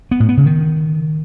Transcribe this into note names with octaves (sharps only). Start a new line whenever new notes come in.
B3
A2
B3
C#3
D#3